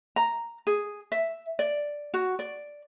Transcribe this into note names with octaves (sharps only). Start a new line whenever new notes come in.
A#5
G#4
E5
D5
F#4
D5